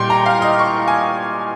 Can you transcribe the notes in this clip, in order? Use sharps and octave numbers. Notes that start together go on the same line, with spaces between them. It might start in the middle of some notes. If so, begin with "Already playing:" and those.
Already playing: A#2 G3 G5 C6
A#5
F5
D#5
C#6
G#5